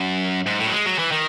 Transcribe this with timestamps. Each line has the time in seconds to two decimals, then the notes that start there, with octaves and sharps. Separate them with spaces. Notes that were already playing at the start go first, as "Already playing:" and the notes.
Already playing: F#2
0.46 G#2
0.59 A2
0.67 F#3
0.73 G#3
0.86 F#3
0.99 E3
1.12 D#3